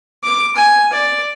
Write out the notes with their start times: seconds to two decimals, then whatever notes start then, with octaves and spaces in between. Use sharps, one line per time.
0.23 D6
0.56 G#5
0.92 D5